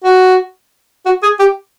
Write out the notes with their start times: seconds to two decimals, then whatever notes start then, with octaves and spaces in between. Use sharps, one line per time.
0.05 F#4
1.06 F#4
1.23 G#4
1.40 G4